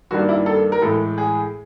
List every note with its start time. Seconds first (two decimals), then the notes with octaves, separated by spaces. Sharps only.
0.11 G2 D#3 G3 A#3 D4 F#4
0.29 E4
0.46 A4
0.72 A#4
0.82 A2 E3 G#3 A4
1.18 G#4